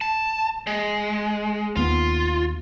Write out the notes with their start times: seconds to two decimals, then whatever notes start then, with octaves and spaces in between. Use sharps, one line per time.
0.01 A5
0.67 G#3
1.76 D#2 B3 F4